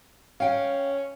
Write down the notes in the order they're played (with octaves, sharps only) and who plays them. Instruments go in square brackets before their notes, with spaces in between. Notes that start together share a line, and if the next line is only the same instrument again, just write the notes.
[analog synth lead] C#4 [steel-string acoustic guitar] F5 G5